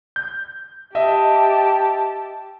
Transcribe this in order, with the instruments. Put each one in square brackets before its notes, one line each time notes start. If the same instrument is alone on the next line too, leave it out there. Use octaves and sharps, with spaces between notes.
[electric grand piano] G6
[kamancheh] G4 A5 [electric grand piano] D#5 E5